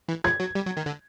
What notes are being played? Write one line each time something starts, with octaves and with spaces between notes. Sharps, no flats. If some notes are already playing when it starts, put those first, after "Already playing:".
E3
F3 G#6
F#3
G3
F#3
D#3
D3